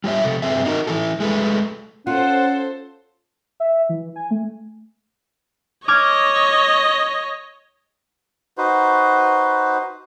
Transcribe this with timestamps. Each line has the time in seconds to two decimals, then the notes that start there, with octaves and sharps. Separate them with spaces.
0.04 G3 F4 C#5 E5
0.24 C3 A4
0.42 G2 C4 G#4 B4 E5
0.65 D4 D#4 F#4 A#4
0.87 E3 A3 E4 A4
1.20 G#3 A3 B4
2.07 C#4 F4 A4 C5 F#5
3.60 E5
3.89 E3
4.16 G#5
4.31 A3
5.88 C#5 D#5 D6 F6 G#6
8.58 D#4 F#4 B4 C5